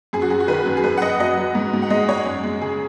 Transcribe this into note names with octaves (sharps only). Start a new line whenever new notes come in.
F#2 G#4
F#4
F#3 G#4
F#4
D#3 B4
F#2
G#4
F#2 B4
F#5
F#2 D#5
F#3 D#5
F#3
G#2
G#2
F#5
G#3 D#5
G#3 C#5
F#2
G#3
C#3 G#4